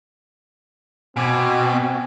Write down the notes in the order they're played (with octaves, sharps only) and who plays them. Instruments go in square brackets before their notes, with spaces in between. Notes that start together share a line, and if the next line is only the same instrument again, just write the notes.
[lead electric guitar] B2 [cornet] C4 [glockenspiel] G#5 D6 G#6